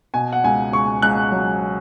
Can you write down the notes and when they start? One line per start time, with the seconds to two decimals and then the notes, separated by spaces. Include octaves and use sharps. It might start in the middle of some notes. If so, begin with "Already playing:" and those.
0.14 B2 G#5
0.33 F#5
0.44 C#2 G#5
0.73 C#2 C#6
1.02 C#2 F#6
1.32 F#3